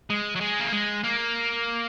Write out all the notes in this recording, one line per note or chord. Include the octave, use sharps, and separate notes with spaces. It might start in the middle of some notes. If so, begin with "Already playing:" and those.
G#3
F#3
G#3
A#3
G#3
A#3